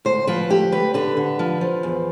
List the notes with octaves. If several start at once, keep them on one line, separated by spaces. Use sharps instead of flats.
D2 C5
F3 B4
D2 G4
D2 B4
D3 B4
D3
F3
F3
E2